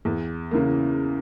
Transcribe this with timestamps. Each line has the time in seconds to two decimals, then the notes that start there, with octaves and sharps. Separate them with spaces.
0.05 E2
0.51 C#3 E3 A#3